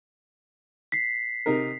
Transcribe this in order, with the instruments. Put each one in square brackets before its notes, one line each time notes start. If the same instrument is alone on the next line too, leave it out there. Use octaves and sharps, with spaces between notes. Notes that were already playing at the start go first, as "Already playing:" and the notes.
[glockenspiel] B6 C7
[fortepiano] C3 D#4 A#4